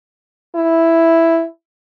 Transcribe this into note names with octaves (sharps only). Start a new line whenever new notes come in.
E4